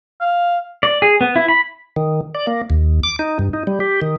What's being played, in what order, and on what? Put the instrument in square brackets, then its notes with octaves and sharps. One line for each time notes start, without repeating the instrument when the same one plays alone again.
[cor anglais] F5
[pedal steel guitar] D5
G#4
B3
E4
B5
[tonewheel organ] D#3
D5
A#3
D#2
D6
D#4
G2
D#4
G3
G4
D#3